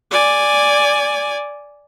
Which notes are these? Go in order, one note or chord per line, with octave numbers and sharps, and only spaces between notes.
D5 G#5